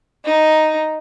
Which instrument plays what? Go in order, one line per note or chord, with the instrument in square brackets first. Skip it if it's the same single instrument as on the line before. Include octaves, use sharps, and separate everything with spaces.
[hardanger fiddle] D#4